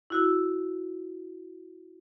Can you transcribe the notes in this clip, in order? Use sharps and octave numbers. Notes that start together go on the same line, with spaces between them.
E4 F#4 E6